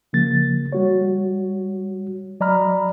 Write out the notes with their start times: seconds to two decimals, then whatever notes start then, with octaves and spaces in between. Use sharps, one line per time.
0.13 C#3 F3 A#3 A6
0.72 G3 F#4 C#5
2.40 F#3 D5 D#5 A#5 B5 F6